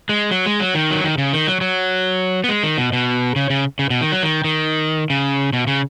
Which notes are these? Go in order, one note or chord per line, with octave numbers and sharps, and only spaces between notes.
G#3
F#3
G#3
F#3
D#3
F#3
D#3
C#3
D#3
F#3
F#3
B3
G#3
D#3
B2
B2
C#3
C#3
C#3
B2
D#3
F#3
D#3
D#3
C#3
B2
C#3